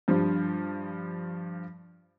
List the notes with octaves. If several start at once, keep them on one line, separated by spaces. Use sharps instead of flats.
G2 F3